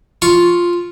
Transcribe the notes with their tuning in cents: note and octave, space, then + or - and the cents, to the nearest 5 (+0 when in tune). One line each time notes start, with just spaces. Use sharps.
F4 +0 C#6 +0